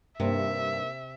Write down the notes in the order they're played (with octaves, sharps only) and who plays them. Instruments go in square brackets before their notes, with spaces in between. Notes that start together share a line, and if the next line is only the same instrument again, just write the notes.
[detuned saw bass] G2 [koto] C3 [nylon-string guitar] A#3 D#4 [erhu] E5